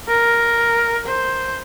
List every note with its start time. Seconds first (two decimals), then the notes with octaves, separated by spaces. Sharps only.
0.08 A#4
1.06 C5